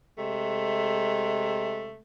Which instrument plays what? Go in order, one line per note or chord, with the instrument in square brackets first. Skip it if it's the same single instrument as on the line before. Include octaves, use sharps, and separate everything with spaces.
[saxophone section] C3 G#3 A3